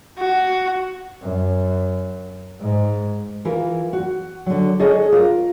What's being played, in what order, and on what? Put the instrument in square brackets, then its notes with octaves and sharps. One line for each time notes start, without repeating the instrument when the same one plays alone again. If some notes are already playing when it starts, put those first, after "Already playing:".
[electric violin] F#4
[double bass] F#2
G#2
[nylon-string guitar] E3 F4 A#4 B4
F#4
D3 F#3
G#4 A4 C#5 D#5
F4 A#4